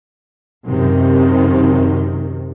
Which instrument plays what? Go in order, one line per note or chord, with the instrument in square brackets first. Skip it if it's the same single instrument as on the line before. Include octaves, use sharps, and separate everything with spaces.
[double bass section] F#2 C3 D#3